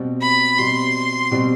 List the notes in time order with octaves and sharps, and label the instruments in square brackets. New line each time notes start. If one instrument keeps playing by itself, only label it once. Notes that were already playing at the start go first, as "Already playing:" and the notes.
Already playing: [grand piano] B2 G3 C4
[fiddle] B5
[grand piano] B2 G3 C4 [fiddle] C6
[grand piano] B2 G3 C4